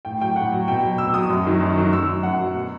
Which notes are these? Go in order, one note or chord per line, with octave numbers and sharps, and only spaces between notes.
A2 G5
F#3 G5
A2 F#5
F#3
B2 G5
F#3
B2 E6
F#3 D#6
F#2
D#3 F#3
F#2
D#3 F#3
F#2 E6
F#3
F#2 F#5
F#3
B2